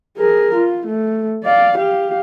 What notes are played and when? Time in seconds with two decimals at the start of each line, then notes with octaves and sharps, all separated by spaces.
0.17 G#4 A#4
0.55 F4
0.87 A3
1.44 D5 F5
1.78 G4 F5